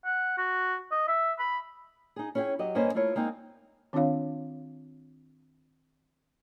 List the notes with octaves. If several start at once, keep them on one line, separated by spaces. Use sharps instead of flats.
F#5
F#4
D#5
E5
B5
D#4 G#4
C#4 E4 G#4 F#5 G5
F#3 G4 D#5
G2 A#3 C#4 B4 C5 D#5
A3 A#3 E4 F4 C#5
G#3 A#3 C4 D#4
D#3 C4 D4 F4 C#5 F5